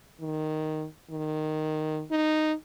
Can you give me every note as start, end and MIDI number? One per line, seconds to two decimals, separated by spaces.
0.21 0.86 51
1.10 2.03 51
2.11 2.54 63